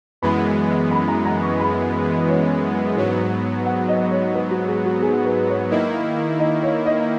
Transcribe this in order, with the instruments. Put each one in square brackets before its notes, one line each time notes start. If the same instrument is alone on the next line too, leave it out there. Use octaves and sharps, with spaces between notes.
[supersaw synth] F#2 E3 G#3 B3 [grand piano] B5
[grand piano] B5
A#5
A#5
C#6
B5
C#5
[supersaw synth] G#2 F#3 B3 [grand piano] C#5
[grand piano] F#5
D#5
C#5
B4
F#4
G#4
F#4
G#4
B4
C#5
[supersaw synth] D#3 A#3 E4 [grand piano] D#5
[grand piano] D#5
C#5
D#5